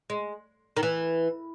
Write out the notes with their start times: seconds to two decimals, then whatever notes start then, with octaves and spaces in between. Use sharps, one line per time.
0.10 G#3
0.77 D#3
0.83 E3